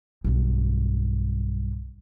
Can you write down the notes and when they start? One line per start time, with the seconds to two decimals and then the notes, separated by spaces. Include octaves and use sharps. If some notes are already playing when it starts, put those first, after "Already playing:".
0.24 B1 G2